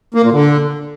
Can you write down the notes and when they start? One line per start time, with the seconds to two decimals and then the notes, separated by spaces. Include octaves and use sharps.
0.15 A#3
0.23 A#2
0.32 D3